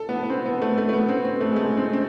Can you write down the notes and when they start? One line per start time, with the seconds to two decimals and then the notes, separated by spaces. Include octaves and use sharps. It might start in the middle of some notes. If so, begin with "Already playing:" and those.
Already playing: A4
0.09 B3
0.23 B3
0.30 C4
0.46 B3
0.62 A3
0.78 A3
0.89 A3
0.93 B3
1.09 C4
1.25 C4
1.35 B3
1.41 A3
1.52 G#3
1.56 A3
1.77 C4
1.93 C4